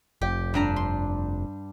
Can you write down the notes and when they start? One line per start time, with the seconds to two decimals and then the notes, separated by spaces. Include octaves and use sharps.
0.21 F1 G4
0.54 G2 D4 A#5
0.76 C6